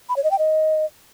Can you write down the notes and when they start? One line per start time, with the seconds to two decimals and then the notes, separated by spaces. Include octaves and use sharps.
0.09 B5
0.16 C#5
0.24 D#5
0.31 G5
0.39 D#5